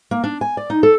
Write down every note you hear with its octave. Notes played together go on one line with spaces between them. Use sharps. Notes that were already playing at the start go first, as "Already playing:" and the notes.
A#3
D4
G#5
D5
D#4
A4